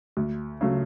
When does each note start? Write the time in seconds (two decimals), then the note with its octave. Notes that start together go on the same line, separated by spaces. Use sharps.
0.17 D2
0.61 C#3 F#3 A3